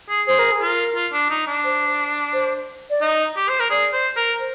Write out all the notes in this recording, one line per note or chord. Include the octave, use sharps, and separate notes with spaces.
G#4
G#4 C5
A#4
G#4
F4 A#4
F4
D4
D#4
D4
C5
C5
D5
D#4 D#5
G4
C5
A#4
G#4 D5
C5
A#4
C5